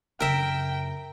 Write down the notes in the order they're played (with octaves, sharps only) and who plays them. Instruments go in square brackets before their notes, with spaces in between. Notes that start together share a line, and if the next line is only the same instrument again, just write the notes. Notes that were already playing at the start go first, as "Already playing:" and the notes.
[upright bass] F#2 C#3 [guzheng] A#4 E5 [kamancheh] G5